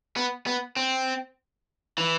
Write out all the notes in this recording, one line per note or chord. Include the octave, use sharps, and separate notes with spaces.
B3
B3
C4
E3